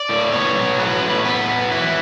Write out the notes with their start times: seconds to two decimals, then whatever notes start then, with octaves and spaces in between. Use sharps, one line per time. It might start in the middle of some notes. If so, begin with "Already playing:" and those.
Already playing: D5
0.09 A2
0.32 B3 C#5
0.57 F#3
0.79 A2 B4
1.02 A2
1.25 B3 B4
1.49 F#3
1.71 E4 B4